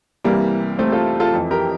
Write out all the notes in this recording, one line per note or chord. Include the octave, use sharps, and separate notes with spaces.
C2 C3 E3 G3 A#3
A3 C4
F4 A4
F4 A4
F2 E3
G4 A#4